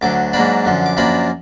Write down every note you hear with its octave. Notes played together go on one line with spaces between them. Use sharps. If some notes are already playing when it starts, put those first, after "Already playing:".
D2 D3 F#3 D6
G#2 F#3 A#3 D4 B5
F#2 D3 F3
D6
F#2 F3 A#3 D4 B5